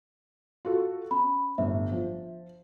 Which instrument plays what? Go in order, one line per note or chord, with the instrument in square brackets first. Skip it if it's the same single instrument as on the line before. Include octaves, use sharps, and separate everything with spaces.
[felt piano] F4 F#4 A4
[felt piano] C#4 [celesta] B5
[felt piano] G1 A2 [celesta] E5
[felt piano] F3